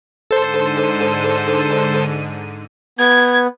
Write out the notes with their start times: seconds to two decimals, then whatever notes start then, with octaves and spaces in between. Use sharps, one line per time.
0.31 G#2 D3 A4 C5 D#7
2.99 B3 G#6